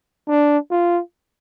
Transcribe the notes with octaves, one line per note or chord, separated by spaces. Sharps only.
D4
F4